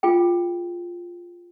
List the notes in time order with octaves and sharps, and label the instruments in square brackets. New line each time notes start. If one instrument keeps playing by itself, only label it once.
[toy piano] F4 G#4 G5